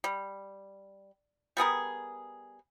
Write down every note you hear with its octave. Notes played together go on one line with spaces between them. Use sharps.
G3
G3 B3 G#4 A#4